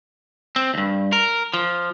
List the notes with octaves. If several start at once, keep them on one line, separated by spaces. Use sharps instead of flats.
C4
D2 G2
A#4
F3